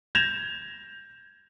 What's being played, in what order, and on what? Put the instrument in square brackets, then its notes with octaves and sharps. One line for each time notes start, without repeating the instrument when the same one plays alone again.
[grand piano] G6 G#6 A#6 E7 F7